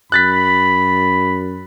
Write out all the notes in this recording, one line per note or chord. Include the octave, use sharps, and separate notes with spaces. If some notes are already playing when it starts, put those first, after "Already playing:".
F#2 B5 F#6 A6 B6